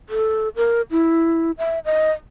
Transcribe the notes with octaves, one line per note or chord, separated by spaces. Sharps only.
A4
A#4
E4
E5
D#5